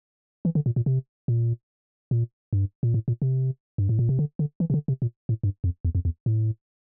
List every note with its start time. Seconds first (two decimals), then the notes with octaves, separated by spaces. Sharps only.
0.45 E3
0.55 D3
0.66 A#2
0.76 A#2
0.86 C3
1.28 A#2
2.11 A#2
2.53 G2
2.83 A#2
2.94 A2
3.08 A#2
3.22 C3
3.78 G2
3.89 A2
3.99 A#2
4.09 C3
4.19 D3
4.39 D3
4.60 E3
4.70 C3
4.74 D3
4.88 C3
5.02 A#2
5.29 A2
5.43 G2
5.64 F2
5.85 E2
5.95 F2
6.05 E2
6.26 A2